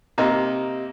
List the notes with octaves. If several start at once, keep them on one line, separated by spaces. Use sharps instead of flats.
C3 A#3 D#4